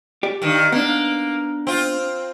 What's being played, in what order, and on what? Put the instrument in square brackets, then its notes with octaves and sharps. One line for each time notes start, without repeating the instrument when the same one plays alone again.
[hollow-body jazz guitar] G4 D5
[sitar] G2 D#3
[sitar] A#3 [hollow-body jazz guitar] B3 D4
[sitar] C4 F4